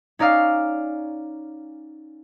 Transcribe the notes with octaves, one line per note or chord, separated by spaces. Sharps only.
C#4 D#4 D5 F5